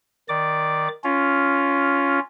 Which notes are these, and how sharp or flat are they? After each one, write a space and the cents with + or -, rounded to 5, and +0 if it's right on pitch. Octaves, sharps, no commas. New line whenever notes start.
D#3 +0 D5 +0 D6 +0
C#4 +10 F4 +0